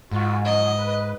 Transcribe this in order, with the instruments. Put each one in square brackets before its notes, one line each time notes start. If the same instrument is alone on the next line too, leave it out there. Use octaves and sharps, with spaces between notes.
[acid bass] G#2 [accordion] F4 F#4
[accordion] C#3 F3 F#3 [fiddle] D#5
[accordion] B4